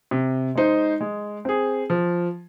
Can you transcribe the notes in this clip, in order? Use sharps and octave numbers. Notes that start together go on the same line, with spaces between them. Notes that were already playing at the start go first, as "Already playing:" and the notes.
C3
G#3 D#4 C5
G#3
C4 G#4
F3